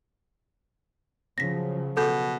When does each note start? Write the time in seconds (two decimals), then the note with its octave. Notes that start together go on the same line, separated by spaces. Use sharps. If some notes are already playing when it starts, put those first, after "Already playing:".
1.38 C#3 F3 F#3 A#6 B6
1.97 B2 A4 G6